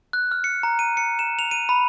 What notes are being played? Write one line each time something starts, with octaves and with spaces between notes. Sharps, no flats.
F#6
F6
C#7
A#5
D#7
C#7
E7
F7
D#7
B5